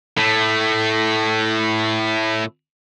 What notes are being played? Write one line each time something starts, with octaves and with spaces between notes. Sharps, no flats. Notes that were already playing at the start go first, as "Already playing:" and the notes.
A2 A3